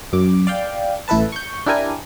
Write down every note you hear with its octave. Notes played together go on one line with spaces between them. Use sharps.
F#2 D6
D5 F5 G5
A1 E4 A4 B4 A5
C#6 G6
D4 E4 G4 A#4 G#5